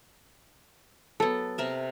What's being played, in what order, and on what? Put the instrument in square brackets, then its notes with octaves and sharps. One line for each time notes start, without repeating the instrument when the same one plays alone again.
[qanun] F#3 B3 [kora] A4
[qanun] C3 A#4 E5